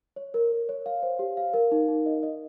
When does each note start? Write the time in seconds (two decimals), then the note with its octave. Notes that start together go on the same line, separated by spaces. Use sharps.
0.16 C#5
0.34 A#4
0.52 A#4
0.69 C#5
0.86 F5
1.03 C5
1.19 G4
1.37 F5
1.54 A#4
1.72 D#4
1.88 D#4
2.06 D#5
2.23 D#5